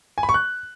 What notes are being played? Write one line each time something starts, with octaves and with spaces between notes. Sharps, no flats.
G#5
B5
C#6
F#6